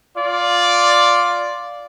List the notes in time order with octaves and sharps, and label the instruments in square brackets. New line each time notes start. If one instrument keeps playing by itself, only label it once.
[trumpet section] F4 D5